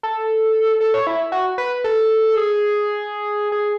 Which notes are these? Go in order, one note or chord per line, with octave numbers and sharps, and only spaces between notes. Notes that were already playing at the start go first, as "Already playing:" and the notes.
A4
A4
C#5
E4
F#4
B4
A4
G#4
G#4